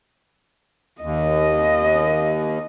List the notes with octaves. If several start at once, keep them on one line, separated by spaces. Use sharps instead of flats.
D#2 D#5